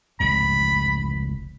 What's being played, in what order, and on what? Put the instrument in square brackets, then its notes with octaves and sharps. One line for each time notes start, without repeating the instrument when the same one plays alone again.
[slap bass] F1 C#2 G#2 [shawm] B5